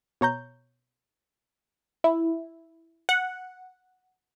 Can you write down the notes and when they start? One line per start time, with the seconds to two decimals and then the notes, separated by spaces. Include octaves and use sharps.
0.21 B2 C#5 A#5 G6
2.04 E4
3.09 F#5